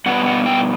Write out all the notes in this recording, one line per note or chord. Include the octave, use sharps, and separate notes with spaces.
B2 G3 B3 F#5
F#5
G5